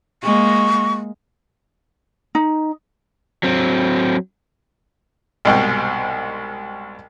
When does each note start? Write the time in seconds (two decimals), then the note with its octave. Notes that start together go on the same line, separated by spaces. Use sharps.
0.23 G#3 A#3 C#6
2.35 D#4
3.43 F#3 C4
5.45 C2 G#2 B2 G5